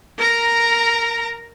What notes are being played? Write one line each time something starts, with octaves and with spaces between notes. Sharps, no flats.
A#4 A#5